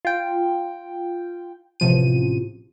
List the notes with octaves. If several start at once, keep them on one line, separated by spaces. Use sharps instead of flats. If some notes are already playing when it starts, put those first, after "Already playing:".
F4 G5
A1 C3 F3 D#7